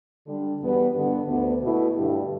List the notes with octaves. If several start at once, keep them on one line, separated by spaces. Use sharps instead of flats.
D3 G3 D4
E2 B2 G3 B3 G4
G2 D3 B3
D2 D3 B3
B2 A3 E4
G2 D3 G3